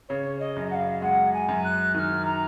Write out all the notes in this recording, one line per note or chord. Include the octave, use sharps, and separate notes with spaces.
C#3 C#5
D#5
F#2
F#5
F5
G#3 F#5
G#5
F#2
F#6
D#3 F6 F#6
A#5